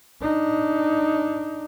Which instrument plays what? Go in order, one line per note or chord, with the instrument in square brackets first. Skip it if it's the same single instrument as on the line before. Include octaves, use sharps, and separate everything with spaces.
[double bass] D4 D#4